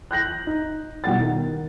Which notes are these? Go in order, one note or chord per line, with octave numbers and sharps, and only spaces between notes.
F#6 G6 A#6 F#7
D#4
B2 G3 F#5 A6
D#3